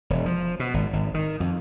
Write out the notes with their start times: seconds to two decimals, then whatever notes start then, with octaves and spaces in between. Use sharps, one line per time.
0.10 E1
0.26 F3
0.60 B2
0.74 G#1
0.93 G#1
1.14 D#3
1.40 F2